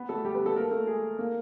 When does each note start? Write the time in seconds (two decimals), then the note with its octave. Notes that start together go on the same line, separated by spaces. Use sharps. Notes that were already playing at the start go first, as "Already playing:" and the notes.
Already playing: B3 B4
0.09 A3 A4
0.25 G3 G4
0.35 B3 B4
0.45 A3 A4
0.56 A#3 A#4
0.71 A3 A4
0.87 G#3 G#4
1.19 A#3 A#4